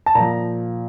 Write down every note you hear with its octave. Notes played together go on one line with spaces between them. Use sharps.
A5
A#2 F3 A#5